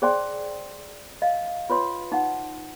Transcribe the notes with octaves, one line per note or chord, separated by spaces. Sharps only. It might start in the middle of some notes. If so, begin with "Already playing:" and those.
G#4 C5 D5 G5 G#5 C6
D#5 F5
F4 B4 C#5 C6
D#4 F#5